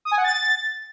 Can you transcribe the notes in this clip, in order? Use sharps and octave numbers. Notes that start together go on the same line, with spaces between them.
D#6
G#5
F#5
A6